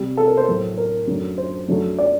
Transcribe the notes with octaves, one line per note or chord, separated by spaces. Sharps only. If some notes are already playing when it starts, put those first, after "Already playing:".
Already playing: C3 G3
A4
A#4
C5
A2 F#3 A3
A#4
F#2 D3 A3
C5
F#2 D3 F#3 A3
D5